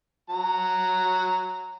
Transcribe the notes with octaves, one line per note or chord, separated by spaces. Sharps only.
F#3 A#5